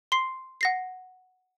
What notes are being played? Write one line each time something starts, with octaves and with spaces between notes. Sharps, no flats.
C6 C7
F#5 A#6 C7